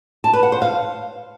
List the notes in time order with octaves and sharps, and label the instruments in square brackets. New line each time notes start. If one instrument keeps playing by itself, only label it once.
[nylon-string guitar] A5
B4
F#5
C5
F5